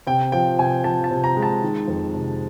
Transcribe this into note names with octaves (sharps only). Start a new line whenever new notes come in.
C3 G5
F3 G5
C3 G#5
F3 A5
A5
C3
A#5
G#3
A5
D#3
F2
C3